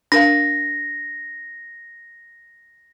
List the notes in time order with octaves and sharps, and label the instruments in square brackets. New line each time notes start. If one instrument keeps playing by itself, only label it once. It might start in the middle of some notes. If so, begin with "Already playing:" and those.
[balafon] D4 A#4 F5 [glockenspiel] A#6